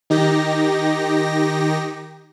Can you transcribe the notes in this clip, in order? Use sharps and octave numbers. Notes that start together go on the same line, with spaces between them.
D#3 D#4 G4 A#6